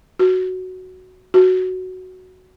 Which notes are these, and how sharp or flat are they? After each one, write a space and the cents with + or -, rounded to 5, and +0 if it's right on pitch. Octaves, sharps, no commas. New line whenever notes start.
F#4 +0
F#4 +0